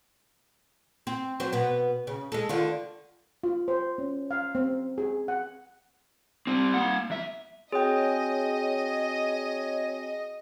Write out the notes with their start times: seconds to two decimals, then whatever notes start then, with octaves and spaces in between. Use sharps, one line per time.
1.07 C4
1.40 F#3 C5
1.53 B2 B3
2.07 C#3
2.32 G#3 A4
2.49 D3 D#3 F4
3.43 F4
3.68 C5
3.98 C#4
4.31 F5
4.55 C4
4.98 G#4
5.28 F#5
6.47 G3 C4
6.74 A#3 F#5
7.10 E2 E5
7.72 C4 F#4 G#4 C#5 D#5 G5 G#5